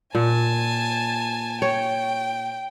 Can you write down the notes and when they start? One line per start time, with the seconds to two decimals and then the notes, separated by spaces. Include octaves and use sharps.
0.15 A#2 G#5 A5
1.62 C#5 G5